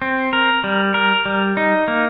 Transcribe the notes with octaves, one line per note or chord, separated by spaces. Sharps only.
C4
A#4
G3
A#4
G3
D#4
A#3